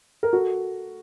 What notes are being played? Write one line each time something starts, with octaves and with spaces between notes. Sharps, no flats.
A#4
F#4 A4